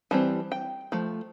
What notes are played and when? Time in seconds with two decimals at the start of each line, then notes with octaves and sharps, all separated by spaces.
0.11 E3 G3 C4 A5
0.52 G5
0.92 F3 A3